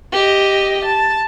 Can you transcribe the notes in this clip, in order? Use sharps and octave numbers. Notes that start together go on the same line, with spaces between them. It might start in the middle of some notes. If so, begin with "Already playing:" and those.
G4 D#5
A5